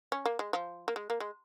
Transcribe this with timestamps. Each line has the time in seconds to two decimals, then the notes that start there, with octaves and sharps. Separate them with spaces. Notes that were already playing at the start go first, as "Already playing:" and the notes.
0.12 C#4
0.26 A#3
0.39 G#3
0.53 F3
0.88 A#3
0.96 G#3
1.10 A#3
1.20 G#3